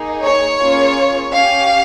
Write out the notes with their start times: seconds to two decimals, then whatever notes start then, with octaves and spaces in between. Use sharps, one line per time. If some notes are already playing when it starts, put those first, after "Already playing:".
Already playing: A#3 D#4 G#4
0.23 C#5
0.60 A#3 C#4 F4 G#4
1.33 C#4 G4 F5